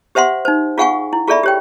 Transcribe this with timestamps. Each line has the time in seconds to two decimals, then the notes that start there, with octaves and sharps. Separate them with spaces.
0.15 G4 C5 E5 F#5 C6
0.45 D#4 C5
0.78 F4 G#4 F5 F#5 G#5 C#6
1.13 E4
1.27 F4 G#4 A4 D5 E5 B5
1.43 G4 C#5 G5